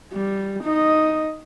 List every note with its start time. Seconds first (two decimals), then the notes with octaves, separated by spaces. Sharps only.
0.12 G3
0.64 D#4 D#5